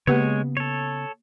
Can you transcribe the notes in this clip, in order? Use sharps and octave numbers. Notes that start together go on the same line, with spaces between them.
C#3 G#3 A#3 B3 G4 B4 C#5
A4 C#5